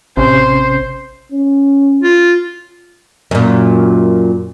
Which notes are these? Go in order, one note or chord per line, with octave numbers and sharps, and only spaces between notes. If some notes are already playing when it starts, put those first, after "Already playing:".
A1 C3 C#4 C5
C#4
F4
F#2 A#2